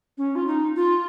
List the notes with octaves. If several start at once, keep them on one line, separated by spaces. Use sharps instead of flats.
C#4
F4
D#4
F4